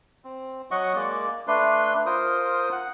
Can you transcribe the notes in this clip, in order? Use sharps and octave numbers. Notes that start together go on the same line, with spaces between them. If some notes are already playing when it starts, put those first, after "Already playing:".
C4
F#3 D#5 F#5 C#6
G#3 A#3 D5
A3 D4 B4 C6
F4 A#4 C5 D#6
F#5